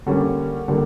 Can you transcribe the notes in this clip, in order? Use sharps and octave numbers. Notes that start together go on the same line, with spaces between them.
D3 G3 A#3 C#4
D3 G3 A#3